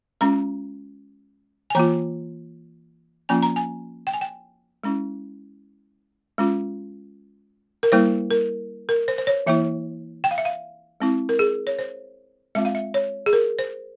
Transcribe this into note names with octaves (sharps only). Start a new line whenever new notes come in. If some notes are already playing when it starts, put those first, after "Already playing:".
G#3 C#4 F4 A#5
G#5
E3 A#3 F4 A#5
F3 A#3 C#4 F4 G#5
A#5
G#5
G5
G#5
G5
G#3 C#4 E4
G#3 C#4 F4
A#4
G3 A#3 E4 C5
A#4
A#4
C5
C5
C#5
E3 A#3 E4 E5
G5
F5
E5
F5
G#3 C4 E4
A#4
G#4
C#5
C5
G#3 C4 F4 E5
F5
E5
C#5
G#4
A#4
C5